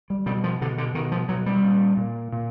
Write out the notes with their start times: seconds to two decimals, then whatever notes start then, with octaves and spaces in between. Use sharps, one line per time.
0.10 G3
0.26 B2 G3
0.44 F3
0.61 B2 D3
0.78 D3
0.95 B2 D#3
1.12 F3
1.29 B2 F#3
1.46 G3
1.64 A#2
1.97 A#2
2.32 A#2